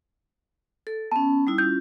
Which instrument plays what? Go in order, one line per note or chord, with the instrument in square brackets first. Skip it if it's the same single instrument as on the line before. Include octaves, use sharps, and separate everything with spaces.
[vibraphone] A4
[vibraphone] B3 C#4 [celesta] A5
[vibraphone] G3 D#4 E4
[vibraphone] C#4 F4 [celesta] G6